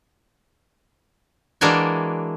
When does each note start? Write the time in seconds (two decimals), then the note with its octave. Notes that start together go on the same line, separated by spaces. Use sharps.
1.61 E3 G#3 A#3 D4 F#4 G#5